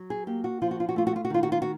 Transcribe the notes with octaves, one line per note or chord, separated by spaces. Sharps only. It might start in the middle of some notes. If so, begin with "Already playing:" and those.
Already playing: F#3
G#4
A#3 G4
F#4
F3 F4
F#4
F4
F#4
A3 F4
F#4
F4
F#4
D#3 F4
F#4
F4
F#4